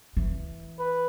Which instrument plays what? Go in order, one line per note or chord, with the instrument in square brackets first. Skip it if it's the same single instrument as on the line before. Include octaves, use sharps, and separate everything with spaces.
[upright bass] E3
[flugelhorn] B4